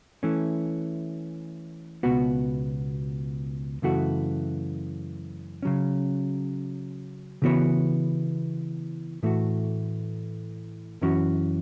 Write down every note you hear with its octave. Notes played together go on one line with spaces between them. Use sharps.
E3 A3 C#4
C#2 B2 B3 F#4
F#2 C#3 E3 A3 F#4
C#3 F#3 C#4
C#3 E3 B3 F#4 C#5
A2 E3 A3 F#4
F#2 E3 C#4 F#4